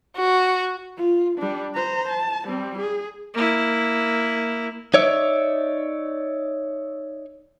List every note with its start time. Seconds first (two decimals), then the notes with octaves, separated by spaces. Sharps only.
0.17 F#4
0.98 F4
1.39 G3 D4
1.74 C5 A#5
2.08 A5
2.46 G3 C4
2.78 G#4
3.34 A#3 E4
4.94 D#4 C#5 D5 E5